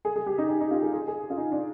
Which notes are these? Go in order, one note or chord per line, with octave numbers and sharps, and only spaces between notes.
G#4
G#4
G4
D#4
D#4
D#4
F4
G#4
G#4
G#4
F4
D#4
D4